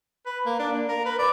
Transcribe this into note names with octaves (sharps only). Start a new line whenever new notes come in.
B4
A#3
D4
A#3
A#4
B4
D5